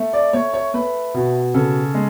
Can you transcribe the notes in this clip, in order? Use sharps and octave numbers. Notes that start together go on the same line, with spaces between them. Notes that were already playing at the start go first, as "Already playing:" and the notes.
Already playing: A3
D5
A3 C#5
C#5
A3 B4
B2
C#3 A4
G#3